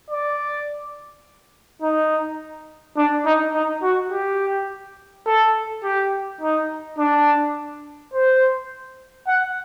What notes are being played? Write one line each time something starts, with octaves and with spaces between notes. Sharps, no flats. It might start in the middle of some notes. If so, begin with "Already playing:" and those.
D5
D#4
D4
D#4
D#4
F#4
G4
A4
G4
D#4
D4
C5
F#5